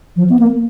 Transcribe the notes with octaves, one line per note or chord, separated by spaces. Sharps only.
F3
B3
A#3